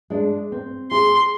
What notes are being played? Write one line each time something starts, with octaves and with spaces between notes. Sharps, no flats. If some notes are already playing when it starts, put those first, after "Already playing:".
G#3 D4
C4
G#4 C6